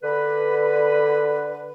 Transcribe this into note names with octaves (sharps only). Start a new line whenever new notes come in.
D3 B4